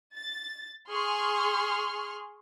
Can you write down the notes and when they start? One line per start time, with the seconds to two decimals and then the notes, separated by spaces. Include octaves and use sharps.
0.15 A6
0.89 G#4 C6 C#6 F6